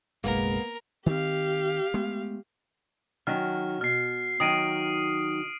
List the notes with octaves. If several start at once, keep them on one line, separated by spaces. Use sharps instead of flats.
F#1 B1 G#3 A#3 B3 A#4
D#3 C4 G4 F5
G#3 A3 B3
D#3 F#3 C#4 F6
B2 F6 C7
D#3 F#3 D#6 D7 D#7